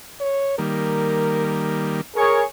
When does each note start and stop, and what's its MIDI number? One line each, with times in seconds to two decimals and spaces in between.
0.20 0.57 73
0.58 2.01 51
0.58 2.01 55
0.58 2.01 58
0.58 1.82 70
2.16 2.43 68
2.16 2.42 70
2.16 2.43 73